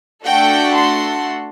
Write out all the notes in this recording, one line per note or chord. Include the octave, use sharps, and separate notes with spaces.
A3 D4 F#4 A4 G5
C6